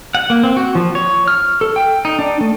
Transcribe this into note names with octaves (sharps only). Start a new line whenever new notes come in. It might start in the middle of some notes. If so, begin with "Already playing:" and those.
F#5
A#3
C4
F#4
F3
C#5
F6
A4
G5
D#4
D4
A3